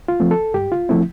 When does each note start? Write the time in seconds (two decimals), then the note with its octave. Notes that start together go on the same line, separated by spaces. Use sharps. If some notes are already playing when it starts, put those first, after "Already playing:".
0.08 F4
0.20 F3 A3 C4
0.31 A4
0.54 G2 G4
0.72 F4
0.89 F3 A3 C4 E4